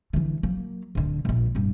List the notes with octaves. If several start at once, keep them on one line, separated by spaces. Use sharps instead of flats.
D3 E3
F#3 A#3
D1 D3
A#1 A#2
D1 G2